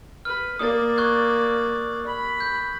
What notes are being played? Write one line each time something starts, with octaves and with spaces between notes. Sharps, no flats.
B4 F6
A#3 D5 D#6 A6
C#6 F#6 G#6
B5
G6